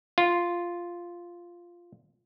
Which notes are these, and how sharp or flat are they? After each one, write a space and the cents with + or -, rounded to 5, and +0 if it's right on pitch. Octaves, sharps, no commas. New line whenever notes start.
F4 -5